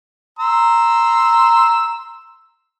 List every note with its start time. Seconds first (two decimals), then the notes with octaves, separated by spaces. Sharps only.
0.39 A#5 C6 E6